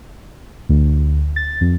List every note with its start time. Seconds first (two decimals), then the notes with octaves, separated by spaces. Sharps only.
0.69 D2
1.36 A6
1.61 F2